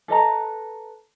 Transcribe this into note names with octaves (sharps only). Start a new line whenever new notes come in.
A4 B4 D#5 A#5